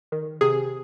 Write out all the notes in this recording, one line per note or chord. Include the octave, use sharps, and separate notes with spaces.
D#3
C3 G#4